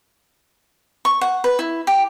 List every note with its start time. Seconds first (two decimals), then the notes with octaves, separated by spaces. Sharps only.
1.05 C#6
1.21 F#5
1.44 B4
1.59 E4
1.87 G4